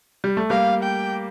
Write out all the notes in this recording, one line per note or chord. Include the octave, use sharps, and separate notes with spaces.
G3
A3
G3 A#3 F5
G5